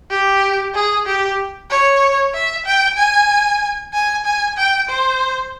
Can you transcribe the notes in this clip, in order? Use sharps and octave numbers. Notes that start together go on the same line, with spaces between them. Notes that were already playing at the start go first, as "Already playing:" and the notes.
G4
G#4
G4
C#5
E5
G5
G#5
G#5
G#5
G5
C5